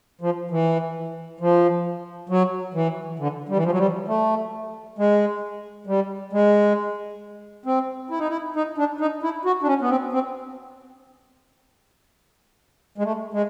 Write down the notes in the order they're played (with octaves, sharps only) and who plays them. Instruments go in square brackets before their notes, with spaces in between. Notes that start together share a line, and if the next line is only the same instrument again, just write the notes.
[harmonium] F3
E3
F3
F#3
E3
D3
G3
E3
F3
F#3
G3
A3
G#3
G3
G#3
C4
E4
D#4
E4
D#4
D4
D#4
E4
F#4
D4
C#4
B3
C4
C4
G#3
A3
G#3